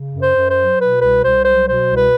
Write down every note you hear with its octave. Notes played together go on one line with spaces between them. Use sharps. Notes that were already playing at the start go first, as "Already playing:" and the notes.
Already playing: C#3
F#2
C5
F#2
C5
F#3
B2 B4
C2 B4
C2 C5
F#3 C5
B2 C5
C2
B4